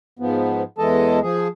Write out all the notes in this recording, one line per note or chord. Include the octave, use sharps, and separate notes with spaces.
G#2 F3 B3
E2 E3 G#3 A4 D#5 A5
F3 G#4